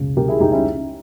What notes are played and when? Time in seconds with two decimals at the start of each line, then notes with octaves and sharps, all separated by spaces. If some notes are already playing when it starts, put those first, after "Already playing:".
Already playing: C#2 C#3
0.17 C#3 G4 A#4
0.28 E4 G#4
0.40 C#2 D#4 G4
0.52 C#4 E4